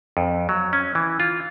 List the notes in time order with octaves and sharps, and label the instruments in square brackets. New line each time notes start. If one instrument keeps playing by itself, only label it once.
[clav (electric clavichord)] F2
F#3
C#4
E3
F4